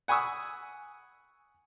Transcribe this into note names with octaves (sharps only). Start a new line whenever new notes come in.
F#5 G#5 B5 C#6 D#6 E6